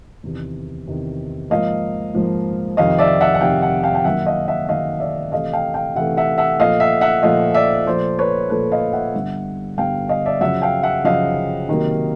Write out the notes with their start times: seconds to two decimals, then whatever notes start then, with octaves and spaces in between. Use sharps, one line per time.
0.23 E2 C3 D#3
0.87 E2 C3 D#3
1.50 G#2 F3 A#3 D#5 F5
2.15 G#2 F3 A#3
2.77 F2 C3 D#3 D#5 F5
2.99 D5 E5
3.21 E5 F#5
3.34 F#5
3.41 F2 C3 D#3 F5 G5
3.62 E5 F#5
3.83 F5 G5
3.95 G5
4.04 F#2 D#3 F#3 A#3 E5 F#5
4.26 D#5 F5
4.48 E5 F#5
4.69 F#2 D#3 F#3 A#3 D#5 F5
5.00 D5 E5
5.32 C3 E3 A3 D#5 F5
5.53 F5 G5
5.74 F5 G5
5.96 C3 E3 A3 E5 F#5
6.17 E5 F#5
6.38 E5 F#5
6.59 A#2 F3 A3 D#5 F5
6.80 E5 F#5
7.01 E5 F#5
7.23 A#2 F3 A3 D#5 F5
7.54 D5 E5
7.86 A#2 F3 A3 C5 D5
8.19 B4 C#5
8.50 A#2 F3 A3 A4 B4
8.72 D#5 F5
8.93 E5 F#5
9.14 G2 D3 G3 B3
9.78 G2 D3 G3 B3 F5 G5
10.09 D#5 F5
10.26 D5 E5
10.41 F#2 C#3 F3 E5 F#5
10.62 F5 G5
10.83 E5 F#5
11.04 F#2 C#3 F3 D#5 F5
11.68 C3 D#3 F#3 A#3